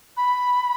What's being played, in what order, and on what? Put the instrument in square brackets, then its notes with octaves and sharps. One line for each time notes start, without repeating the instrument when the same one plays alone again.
[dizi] B5